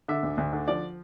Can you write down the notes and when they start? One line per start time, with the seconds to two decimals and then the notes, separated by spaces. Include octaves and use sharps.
0.08 D3 E5
0.23 D2
0.38 D2
0.53 D3
0.68 F3 D5